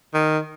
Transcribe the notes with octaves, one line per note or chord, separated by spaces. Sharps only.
D#3